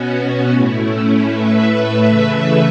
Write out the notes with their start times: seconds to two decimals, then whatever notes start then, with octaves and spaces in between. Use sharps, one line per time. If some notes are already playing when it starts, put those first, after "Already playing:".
Already playing: B2 B3 C#4 F#4
0.13 C#4 F#4
0.52 A2 A3 E4
0.90 C#4
1.28 A2 A3 B4 E5
2.06 C#3 E3 A3 B4 E5